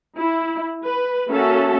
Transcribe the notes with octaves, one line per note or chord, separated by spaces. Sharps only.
E4
B4
A#3 C#4 F#4 A4 E5 A5